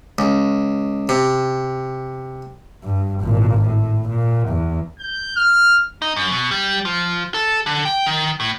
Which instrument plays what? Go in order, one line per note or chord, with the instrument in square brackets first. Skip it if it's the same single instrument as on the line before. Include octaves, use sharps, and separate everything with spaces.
[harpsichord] C#2
C3
[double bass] G2
G#1 A#2
A2
A#2
E2
[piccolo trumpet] G6
F6
[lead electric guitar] D#4
F#2
B2
G3
F3
A4
D3
G5
D#3
A2